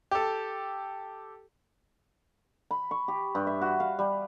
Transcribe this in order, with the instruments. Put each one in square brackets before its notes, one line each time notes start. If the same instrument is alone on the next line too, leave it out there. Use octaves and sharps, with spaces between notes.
[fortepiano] G4 A4
[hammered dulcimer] B5
C#6
G4
G2
E5
F#4
F5
G3